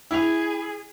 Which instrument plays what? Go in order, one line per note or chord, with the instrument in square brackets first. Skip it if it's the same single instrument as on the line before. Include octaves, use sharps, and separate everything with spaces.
[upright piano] E4 F7 [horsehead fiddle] G#4